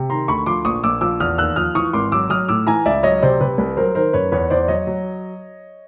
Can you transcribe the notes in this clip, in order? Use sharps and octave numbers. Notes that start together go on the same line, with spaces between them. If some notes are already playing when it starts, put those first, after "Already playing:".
Already playing: C3
D#3 A#5 C6
D2 B5 C#6
F3 C6 D6
A#1 C#6 D#6
A#1 D6 E6
F3 D6 E6
E2 D#6 F6
D#2 E6 F#6
F3 D#6 F6
E3 C#6 D#6
G#1 C6 D6
F#3 D6 E6
F#3 D#6 F6
A2 D6 E6
E3 G#5 A#5
C#2 D5 E5
F#3 C#5 D#5
C3 C5 D5
C3 B4
C2 B4
F#3 A#4 C5
D#3 A#4 C5
F#2 B4 C#5
E2 B4 C#5
E2 C5 D5
F#3 C#5 D#5
F#3